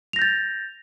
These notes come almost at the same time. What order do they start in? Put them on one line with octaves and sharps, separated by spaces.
F7 A#6 G6 A6